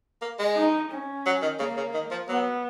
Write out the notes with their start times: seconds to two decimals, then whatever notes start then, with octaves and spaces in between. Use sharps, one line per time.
0.22 A#3
0.39 G#3
0.56 D#4
0.91 C#4
1.26 F#3
1.42 D#3
1.59 C#3 A#3
1.77 C#3
1.94 D#3
2.11 F3
2.28 F#3 B3